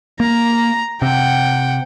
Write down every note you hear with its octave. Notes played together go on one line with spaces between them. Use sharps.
A#3 A#5
C3 F#5 G5